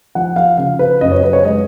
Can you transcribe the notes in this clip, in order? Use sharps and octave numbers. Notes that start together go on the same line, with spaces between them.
F3 F#5
F5
C#3 F5
B4
F#2 D#5
C#5
B4
C#5
G#3 D#5